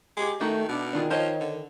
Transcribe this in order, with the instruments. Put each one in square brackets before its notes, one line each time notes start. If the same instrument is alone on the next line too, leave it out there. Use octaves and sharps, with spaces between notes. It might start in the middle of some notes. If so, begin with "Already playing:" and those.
[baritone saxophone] G#3 [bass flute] G4
[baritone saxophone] D#3 [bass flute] A3 [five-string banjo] D#4 F#4 E5
[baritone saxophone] B2 [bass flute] D4
[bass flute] D#3 [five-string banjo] D4 F4 G#4
[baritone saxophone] F3 [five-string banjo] C5 C#5 D#5
[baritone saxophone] D3